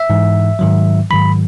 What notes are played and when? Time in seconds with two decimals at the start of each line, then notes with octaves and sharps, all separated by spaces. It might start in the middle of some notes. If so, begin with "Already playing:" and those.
Already playing: E5
0.10 G#2 E3
0.59 G#2 D#3 F#3
1.10 G#2 D#3 F#3 B5